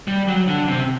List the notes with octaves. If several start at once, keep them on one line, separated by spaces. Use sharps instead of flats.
G3
F#3
D3
C3